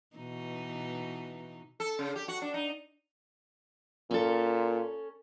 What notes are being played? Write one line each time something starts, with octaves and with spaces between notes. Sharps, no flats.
B2 E3 D#4
A4
C#3
G4
F#4
D4
D#4
A#2 C#4 A4